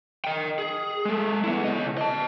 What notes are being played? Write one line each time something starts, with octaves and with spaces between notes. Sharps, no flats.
D#5 G5
G#4
G#3 A4
B3 E4
C#3 D#5
D#5 A5